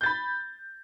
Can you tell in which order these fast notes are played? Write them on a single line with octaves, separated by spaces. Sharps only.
G6 A6 B5